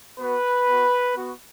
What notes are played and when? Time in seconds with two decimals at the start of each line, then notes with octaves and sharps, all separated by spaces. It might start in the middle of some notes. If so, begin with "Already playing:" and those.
0.20 B3 F#4 B4
0.68 B3 F#4
1.16 B3 F#4